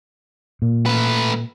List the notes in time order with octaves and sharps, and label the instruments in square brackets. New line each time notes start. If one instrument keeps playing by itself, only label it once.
[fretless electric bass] A#2
[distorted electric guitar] A3 B4